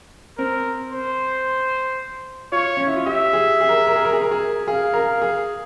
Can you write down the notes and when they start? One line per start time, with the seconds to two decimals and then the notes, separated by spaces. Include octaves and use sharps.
0.38 C4 A#4
0.92 C5
2.52 F4 C#5
2.77 C#4
2.87 E4
2.96 F4
3.06 G4 E5
3.33 G#4
3.61 G#4
3.69 A#4
3.78 G#4
3.87 A#4
3.96 G#4
4.05 A#4
4.13 G#4
4.21 A#4
4.31 G#4
4.68 G#4 F5
4.94 A#4
5.22 G#4